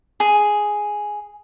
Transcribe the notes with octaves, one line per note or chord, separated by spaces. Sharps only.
G#4